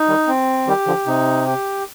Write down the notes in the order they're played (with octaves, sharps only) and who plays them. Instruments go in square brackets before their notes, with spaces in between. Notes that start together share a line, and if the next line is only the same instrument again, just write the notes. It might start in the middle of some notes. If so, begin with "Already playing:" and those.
Already playing: [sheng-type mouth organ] D#4
[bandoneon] D#3 G3
[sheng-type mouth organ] C4
[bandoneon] D#3 G3 [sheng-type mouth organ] G4
[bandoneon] D3 F3
[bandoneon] C3 [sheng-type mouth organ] D#4
[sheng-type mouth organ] G4